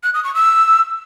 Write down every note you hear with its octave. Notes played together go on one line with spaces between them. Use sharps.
F#6
D#6
C#6
E6